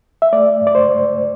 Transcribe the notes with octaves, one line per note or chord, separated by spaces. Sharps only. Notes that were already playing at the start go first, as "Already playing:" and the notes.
E5
A3 D5
G2
D5
C5
G2